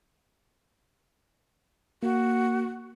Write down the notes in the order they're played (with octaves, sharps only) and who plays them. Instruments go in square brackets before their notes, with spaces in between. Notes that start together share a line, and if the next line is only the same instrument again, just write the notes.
[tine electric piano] A#3 [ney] F#4